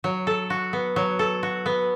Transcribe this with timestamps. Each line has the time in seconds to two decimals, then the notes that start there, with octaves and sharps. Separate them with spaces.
0.04 F#3
0.27 A4
0.50 F#4
0.73 B3
0.96 F#3
1.19 A4
1.43 F#4
1.66 B3